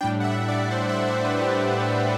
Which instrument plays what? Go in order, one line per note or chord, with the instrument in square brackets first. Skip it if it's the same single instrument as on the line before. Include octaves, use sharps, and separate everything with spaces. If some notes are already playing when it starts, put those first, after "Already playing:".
[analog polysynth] A2 G3 D4 G5
F#5
E5
D5
C5
E5
C5
B4
G4